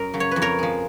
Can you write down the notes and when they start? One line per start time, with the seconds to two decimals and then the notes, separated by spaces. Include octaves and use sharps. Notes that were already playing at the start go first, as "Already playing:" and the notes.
Already playing: F#2 A#4
0.14 C#3 F#3
0.20 C#5
0.31 F2 B4
0.42 A#4 C#5
0.59 F3 G#3